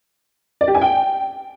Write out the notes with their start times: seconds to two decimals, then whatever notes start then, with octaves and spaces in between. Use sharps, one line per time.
0.61 D5
0.68 G4
0.75 G#5
0.81 G5